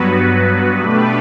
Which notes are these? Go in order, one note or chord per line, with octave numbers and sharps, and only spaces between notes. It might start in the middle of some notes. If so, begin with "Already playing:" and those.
Already playing: G2 F#3 B3 F#4 B4
B2 A3 D4 G4 B4